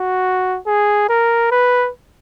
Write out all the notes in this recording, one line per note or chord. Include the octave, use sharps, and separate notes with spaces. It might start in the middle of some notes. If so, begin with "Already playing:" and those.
Already playing: F#4
G#4
A#4
B4